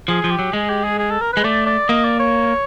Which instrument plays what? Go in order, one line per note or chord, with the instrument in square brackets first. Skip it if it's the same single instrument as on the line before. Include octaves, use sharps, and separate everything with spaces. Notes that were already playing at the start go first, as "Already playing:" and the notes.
[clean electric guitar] F3 [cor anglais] G#4
[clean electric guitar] F3
[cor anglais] G4
[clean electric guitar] F#3
[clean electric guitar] G#3 [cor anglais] G#4
[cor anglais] G4
G#4
G#4
A4
A#4
[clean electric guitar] G#3 [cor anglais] B4
[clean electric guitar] A3 [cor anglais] D5
[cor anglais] D5
[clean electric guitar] A#3 [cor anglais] D#5
[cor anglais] D5
C#5